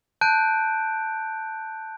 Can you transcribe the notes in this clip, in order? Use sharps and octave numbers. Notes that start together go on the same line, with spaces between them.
A5 F#6 G6 D7